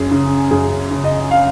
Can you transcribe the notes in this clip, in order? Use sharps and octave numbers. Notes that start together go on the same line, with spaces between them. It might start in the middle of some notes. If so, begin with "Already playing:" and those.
Already playing: F#2 G#4
C#3
F#2 G#4
C#3
D#5
F5